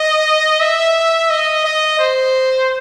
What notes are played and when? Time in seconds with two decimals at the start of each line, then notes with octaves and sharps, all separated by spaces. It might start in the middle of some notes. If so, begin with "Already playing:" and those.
Already playing: D#5
0.61 E5
1.30 D#5
1.65 D#5
1.99 C5